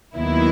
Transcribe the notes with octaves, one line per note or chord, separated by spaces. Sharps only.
D#2 D#3 F#3 B3 E4